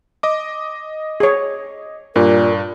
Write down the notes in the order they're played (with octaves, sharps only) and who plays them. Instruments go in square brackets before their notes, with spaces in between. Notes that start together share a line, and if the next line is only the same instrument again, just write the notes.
[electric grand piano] D#5 D6
[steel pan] G#4 C#5
[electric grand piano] G2 [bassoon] A#2 [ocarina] A#4